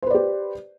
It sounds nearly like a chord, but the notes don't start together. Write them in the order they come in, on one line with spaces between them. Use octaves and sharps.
C5 B4 D5 G4